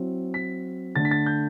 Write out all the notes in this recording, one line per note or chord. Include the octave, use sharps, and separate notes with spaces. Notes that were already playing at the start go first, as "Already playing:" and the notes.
Already playing: F#3 C4 E4
B6
D3 A3 D4 A6
B6
A6
G6